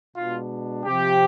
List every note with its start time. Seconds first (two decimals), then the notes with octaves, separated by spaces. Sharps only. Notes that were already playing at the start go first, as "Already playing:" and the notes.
0.17 B2 G#3 D4 F4
0.85 C3 F3 C4 G4